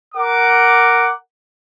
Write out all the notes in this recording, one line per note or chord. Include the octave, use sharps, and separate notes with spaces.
A#4 F#5 D6